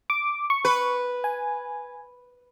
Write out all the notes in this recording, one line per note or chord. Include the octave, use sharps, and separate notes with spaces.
D6
C#6
B4
G#5